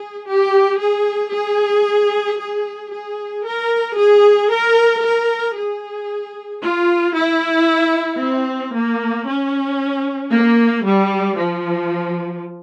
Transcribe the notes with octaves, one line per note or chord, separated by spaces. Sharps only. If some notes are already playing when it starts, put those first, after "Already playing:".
Already playing: G#4
G4
G#4
G#4
G#4
G#4
A#4
G#4
A#4
A#4
G#4
F4
E4
C4
A#3
C#4
A#3
G3
F3